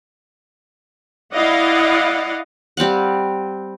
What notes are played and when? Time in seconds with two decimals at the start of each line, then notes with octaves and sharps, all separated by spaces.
1.34 E4 D5 D#5 F5 F#5
2.77 G3 C4 F5 F#5